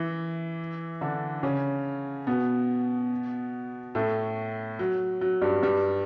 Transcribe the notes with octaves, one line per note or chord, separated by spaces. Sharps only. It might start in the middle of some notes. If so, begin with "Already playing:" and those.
Already playing: E3 E4
D3 D4
C#3 C#4
B2 B3
A2 A3
F#3
F#3
G2 G3
G2 G3